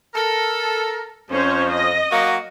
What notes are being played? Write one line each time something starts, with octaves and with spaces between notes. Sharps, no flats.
A4 A#4
F2 C#4 C5 C#5
D#5
F#3 A#3 F#4